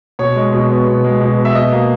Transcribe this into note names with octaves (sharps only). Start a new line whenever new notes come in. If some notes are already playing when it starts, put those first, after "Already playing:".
B2 C#5
G#3
B2
B3
B2
G#3
B2
B3
E5
B2 D#5
A#3